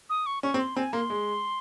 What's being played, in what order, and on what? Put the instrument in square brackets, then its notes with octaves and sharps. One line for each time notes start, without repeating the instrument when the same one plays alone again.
[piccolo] D#6
C#6
[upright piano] C#4 [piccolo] C#6
[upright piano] C4
[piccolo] C6
[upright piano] C4 [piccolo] G#5
[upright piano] A#3 [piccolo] C6
[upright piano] G#3